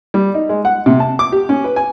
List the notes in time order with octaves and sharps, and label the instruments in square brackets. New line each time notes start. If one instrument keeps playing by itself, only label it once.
[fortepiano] G3
D#4
G#3
F#5
C3
A5
D6
G4
C#4
B4
G#5